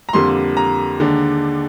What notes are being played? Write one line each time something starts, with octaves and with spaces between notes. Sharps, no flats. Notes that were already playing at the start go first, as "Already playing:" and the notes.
A#5
F2 D3 G3 A#3 C6
A#5
D#2 D3 G#3 D4